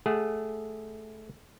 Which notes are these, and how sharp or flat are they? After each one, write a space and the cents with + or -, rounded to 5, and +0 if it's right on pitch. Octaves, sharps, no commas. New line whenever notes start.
A3 -15 G#4 -15 F#5 +0